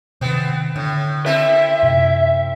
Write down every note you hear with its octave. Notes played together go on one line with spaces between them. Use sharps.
C3 D#3 B3 C4
A2 D3
C4 E4 A4 E5
F#2 C3